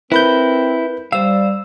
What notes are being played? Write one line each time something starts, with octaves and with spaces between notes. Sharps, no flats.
C4 E4 A#4 B4 B5 G6
G3 C5 F5 E6